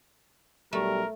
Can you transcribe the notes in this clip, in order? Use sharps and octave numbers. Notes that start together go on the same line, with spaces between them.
B1 G3 A3 A#4